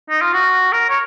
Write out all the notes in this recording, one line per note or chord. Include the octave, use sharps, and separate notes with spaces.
D#4
F4
F#4
A#4
C#5